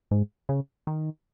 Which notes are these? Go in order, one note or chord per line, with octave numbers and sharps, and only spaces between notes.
G#2
C#3
D#3